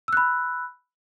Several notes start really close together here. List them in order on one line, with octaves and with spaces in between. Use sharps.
E6 F#6 B5